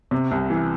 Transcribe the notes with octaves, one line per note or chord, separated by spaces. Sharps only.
C3
C2
E3